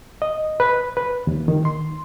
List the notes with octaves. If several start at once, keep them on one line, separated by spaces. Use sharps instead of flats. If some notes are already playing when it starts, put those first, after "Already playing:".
D#5
B4
B4
D#2
D#3
C6